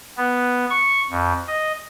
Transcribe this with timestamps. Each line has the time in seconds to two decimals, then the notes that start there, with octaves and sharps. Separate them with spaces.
0.17 B3
0.70 C#6
1.10 F2
1.48 D#5